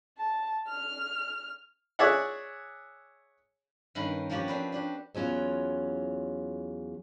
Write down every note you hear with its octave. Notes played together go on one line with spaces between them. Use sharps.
A5
F6
G#4 C#5 D5 E5 F#5
G2 D#3 C#4 A#4 B4 B5
F3 A#3 C#4 F#4 G4
C4 D4 B4
D4 F#4 G4
E2 F#3 C#4 F4 F#5